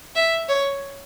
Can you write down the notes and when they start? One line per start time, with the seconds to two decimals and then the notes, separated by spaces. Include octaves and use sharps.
0.16 E5
0.49 C#5